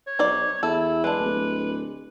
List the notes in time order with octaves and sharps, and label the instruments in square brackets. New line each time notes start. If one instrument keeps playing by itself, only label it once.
[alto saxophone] C#5
[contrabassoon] B1 [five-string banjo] D#4 C5 D5
[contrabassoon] E2 [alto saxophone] E4 [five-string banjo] A4
[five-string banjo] G#3 D4 [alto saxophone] B4
[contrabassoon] D1